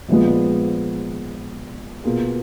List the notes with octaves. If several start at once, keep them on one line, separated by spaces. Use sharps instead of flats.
A#1 A#2 F3 G#3 B3
B2 A#3 F4 G#4